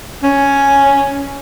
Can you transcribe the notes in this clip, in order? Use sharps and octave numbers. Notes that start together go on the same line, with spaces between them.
C#4